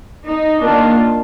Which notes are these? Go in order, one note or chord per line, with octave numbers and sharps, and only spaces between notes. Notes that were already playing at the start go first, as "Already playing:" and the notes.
D#4
D#3 A#3 D4 F4